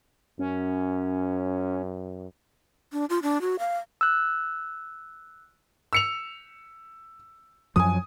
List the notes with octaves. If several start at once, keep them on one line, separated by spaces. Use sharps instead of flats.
F#2 C#4
D4
F4
D4
F#4
F5
E6 F#6
E6 C#7 F7
F#2 F3 F#3 G#5 D#6